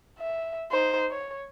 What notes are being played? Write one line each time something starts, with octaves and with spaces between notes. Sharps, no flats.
E5
D#4 C5
C#5